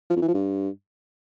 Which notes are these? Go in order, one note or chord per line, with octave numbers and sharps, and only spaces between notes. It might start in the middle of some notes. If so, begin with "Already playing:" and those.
F3
F2
E3
F3
G2